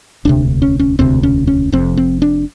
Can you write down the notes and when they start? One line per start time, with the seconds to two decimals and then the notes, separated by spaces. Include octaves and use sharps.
0.25 E1 D2 C3 D4
0.62 C#4
0.79 C#4
0.99 E1 D2 C3 C4
1.23 C#4
1.47 C#4
1.72 F1 F2 C3 C4
1.97 C4
2.22 D4